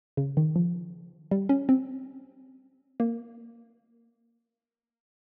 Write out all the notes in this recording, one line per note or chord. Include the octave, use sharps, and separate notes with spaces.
C#3
D#3
F3
G3
C#4
C4
A#3